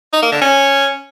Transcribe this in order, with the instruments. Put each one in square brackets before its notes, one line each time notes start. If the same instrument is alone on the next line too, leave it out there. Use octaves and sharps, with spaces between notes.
[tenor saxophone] D#4
A#3
D3
C#4